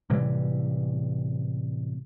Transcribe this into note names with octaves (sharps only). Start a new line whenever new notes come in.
A2 C3 E3 G3